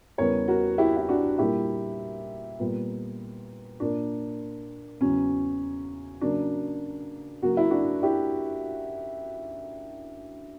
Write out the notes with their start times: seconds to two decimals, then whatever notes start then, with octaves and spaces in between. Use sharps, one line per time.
0.18 E2 C#3 G3 B3 A#4 C#5
0.48 F#4 A#4
0.78 E4 G4
0.97 E4
1.09 D4 F#4
1.38 A#2 G3 A#3 E4 G4
2.60 A#2 G3 B3
3.80 A#2 A#3 D4
5.01 E2 C#3 F#3 C#4
6.21 C#3 F#3 A#3 D4
7.42 C#3 F#3 A#3 F#4
7.57 E4
7.70 D4 F#4
8.03 E4 G4